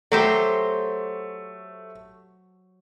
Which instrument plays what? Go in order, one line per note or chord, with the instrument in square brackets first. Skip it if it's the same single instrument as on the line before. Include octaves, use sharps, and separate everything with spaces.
[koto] F#3 G4 C5 [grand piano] A3